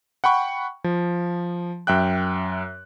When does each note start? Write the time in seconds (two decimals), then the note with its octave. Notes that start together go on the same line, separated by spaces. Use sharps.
0.24 F#5 G5 B5 C#6
0.84 F3
1.87 F#2 E5 G5 F#6